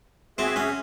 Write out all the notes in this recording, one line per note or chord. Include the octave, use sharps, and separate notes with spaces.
C4 F#4 G#4 E5
C#4